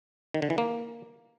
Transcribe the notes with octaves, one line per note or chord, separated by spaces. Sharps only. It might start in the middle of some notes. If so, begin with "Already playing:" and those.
D#3
D3
E3
A#3